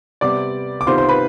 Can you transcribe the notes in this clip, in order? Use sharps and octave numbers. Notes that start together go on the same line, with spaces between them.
C3 G3 B3 D5 D6
D6
C3 D#3 B3 F4 C5 C6
C5 C6
B4 B5